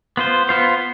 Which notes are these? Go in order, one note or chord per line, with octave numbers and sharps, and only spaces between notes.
B3 F4 C5
B3 F4 C5